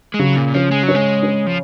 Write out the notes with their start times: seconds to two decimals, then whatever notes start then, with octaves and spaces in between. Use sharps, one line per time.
0.14 G#3
0.19 C#3 F#3
0.37 A#2
0.54 F3 C#4
0.71 G#3
0.83 F#3
0.88 C#4
0.95 G#3
1.23 C#4
1.46 F3